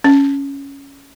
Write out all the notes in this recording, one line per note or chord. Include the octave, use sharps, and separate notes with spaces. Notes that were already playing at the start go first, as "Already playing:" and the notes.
C#4